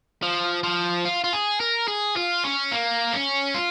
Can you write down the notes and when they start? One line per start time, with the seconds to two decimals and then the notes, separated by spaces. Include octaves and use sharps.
0.22 F3
0.63 F3
1.05 F4
1.24 F4
1.33 G#4
1.60 A#4
1.88 G#4
2.16 F4
2.44 C#4
2.72 A#3
3.13 C#4
3.54 F4